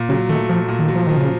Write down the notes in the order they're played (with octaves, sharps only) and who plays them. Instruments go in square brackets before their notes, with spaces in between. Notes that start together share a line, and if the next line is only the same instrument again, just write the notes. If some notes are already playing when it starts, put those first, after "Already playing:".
Already playing: [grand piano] A#2
[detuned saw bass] C#3 [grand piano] F#3
[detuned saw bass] D#3 [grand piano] A3
[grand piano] A#2 [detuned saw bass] F3
[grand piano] A#2
[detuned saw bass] D#3
[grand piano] F#3
[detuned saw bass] F3
[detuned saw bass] D#3 [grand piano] F3
[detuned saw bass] C#3